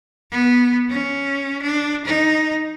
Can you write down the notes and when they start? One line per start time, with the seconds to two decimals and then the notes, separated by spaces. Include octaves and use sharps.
0.31 B3
0.90 C#4
1.62 D4
2.05 D#4